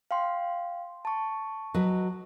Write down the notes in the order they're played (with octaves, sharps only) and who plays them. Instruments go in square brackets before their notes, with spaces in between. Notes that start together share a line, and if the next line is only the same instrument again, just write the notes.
[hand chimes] F5 G5 C6
A5 C#6
[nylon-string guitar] F#3 B4 D#5